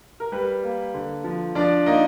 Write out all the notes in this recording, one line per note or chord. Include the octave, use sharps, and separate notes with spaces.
A#4
G3 B4
A#3
D3
F3
F3 D4 D5
A#3 D#4 D#5